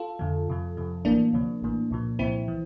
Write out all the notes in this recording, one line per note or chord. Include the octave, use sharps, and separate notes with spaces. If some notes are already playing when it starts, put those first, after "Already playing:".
Already playing: F4 A4
F2 D3 F3
F2 C3 F3
F2 C3 F3
A1 A2 E3 A#3 D4
D2 C3 F3
A1 A2 E3
C2 A#2 F3
C2 A#2 F3 C4 E4
E3